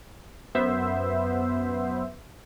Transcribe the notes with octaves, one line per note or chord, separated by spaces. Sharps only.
F#2 B3 C5 E5